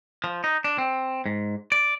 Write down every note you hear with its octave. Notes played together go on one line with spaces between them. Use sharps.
F3
D#4
D4
C4
G#2
D5